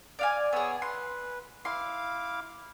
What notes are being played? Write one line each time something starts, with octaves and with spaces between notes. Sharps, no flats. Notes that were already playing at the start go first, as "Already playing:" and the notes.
D5 F5 G#5
B3 G#4 C#5 E6
B4 C6
E4 F5 C6 D6